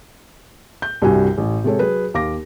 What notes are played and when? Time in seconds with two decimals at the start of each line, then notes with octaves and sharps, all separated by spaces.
0.82 G6
1.02 C2 G2 C3 F#4 G#5
1.38 A1
1.64 C3 G#3 A4 C#5
1.79 F#3 G#4 B4
2.14 D#2 F5 D6 A#6